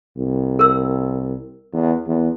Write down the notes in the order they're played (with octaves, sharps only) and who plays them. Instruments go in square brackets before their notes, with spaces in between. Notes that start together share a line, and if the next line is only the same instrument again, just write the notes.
[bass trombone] C2
[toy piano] A#4 E6
[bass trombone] E2
E2